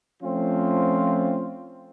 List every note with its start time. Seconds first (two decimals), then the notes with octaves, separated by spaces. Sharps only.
0.23 F3 A3 C4 C#4 F4